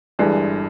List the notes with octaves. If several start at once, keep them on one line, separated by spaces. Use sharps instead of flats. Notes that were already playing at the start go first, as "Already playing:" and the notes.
G1 G2 E3 G#3